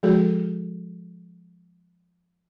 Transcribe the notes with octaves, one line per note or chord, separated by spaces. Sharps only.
F3 G#3 F#4 G#4 A4